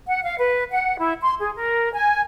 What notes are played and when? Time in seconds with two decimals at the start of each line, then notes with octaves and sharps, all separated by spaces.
0.06 F#5
0.24 F5
0.38 B4
0.71 F#5
0.98 E4
1.21 C6
1.39 G#4
1.55 A#4
1.93 G#5